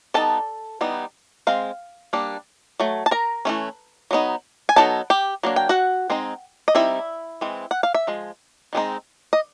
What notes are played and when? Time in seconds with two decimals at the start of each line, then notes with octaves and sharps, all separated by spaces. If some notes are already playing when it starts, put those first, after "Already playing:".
0.14 G3 B3 D#4 A4 A5
0.81 E3 G3 B3 D#4
1.47 G#3 C4 F5
2.13 G3 A#3 D4
2.80 F#3 A3
3.06 A5
3.11 A#4 A#5
3.45 E3 A3 C#4
4.11 F#3 B3 D#4
4.69 G#5
4.76 F#3 B3 D#4 A4 A5
5.10 G4 G5
5.43 F#3 A#3 D4
5.56 G5
5.69 F#4 F#5
6.10 G#3 C4 D#4
6.68 D#5
6.75 G3 C4 D#4 E4 E5
7.41 E3 G#3 C4
7.71 F#5
7.83 F5
7.94 E5
8.07 F3 G#3
8.73 D#3 G#3 C4 D#4
9.33 D#5